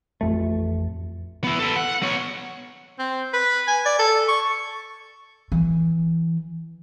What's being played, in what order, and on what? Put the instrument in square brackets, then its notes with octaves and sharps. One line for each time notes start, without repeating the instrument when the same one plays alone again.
[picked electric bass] A1 F2 A3
[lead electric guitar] B3 E4
A4 B4
F#5
B3 C#5
[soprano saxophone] C4
B4
G#5
D5
A4
C#6
[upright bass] E3